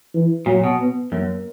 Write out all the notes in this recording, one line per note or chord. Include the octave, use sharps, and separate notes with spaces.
E3
A#2 F#3
B2
B3
F#2 A#3